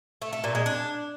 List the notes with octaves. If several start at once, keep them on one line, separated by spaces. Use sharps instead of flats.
A3
A3
A#2
G#3
D4